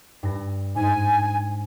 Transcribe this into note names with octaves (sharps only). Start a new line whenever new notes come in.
G2 A#6
G#2 G#5